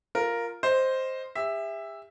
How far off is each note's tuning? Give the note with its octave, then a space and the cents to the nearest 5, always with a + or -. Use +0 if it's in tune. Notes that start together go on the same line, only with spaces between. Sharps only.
F4 +0 A#4 +0
C5 +0 D#5 +0
G4 +45 E5 +0